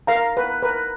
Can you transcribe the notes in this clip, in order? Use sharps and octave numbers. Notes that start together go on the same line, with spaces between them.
A#4 F5 A#5
B4
A#4 B4